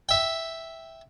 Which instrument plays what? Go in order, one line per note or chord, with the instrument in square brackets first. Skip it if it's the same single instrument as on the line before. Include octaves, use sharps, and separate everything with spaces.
[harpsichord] E5 G5